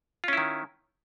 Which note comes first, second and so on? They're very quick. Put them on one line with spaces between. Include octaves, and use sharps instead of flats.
F4 C#4 E4 D#3